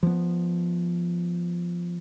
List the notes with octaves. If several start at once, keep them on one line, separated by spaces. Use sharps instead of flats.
F3 B3